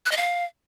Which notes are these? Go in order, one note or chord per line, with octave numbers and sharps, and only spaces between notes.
F#6
D#5
F5